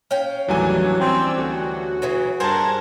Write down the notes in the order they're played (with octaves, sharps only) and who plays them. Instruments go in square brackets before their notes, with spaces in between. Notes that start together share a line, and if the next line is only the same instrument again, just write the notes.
[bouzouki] C#4 F5 G5
[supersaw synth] D#2 A2 D4 [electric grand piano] E3 G3 G#5 [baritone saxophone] F#3
[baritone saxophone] C4 [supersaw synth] D5 E6
[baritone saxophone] D2 [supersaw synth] F#4
[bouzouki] C#3 E3 F#3
[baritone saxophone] G2 [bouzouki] G#4 A#4 F#5 [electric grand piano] C5 A5 [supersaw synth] G#6 A#6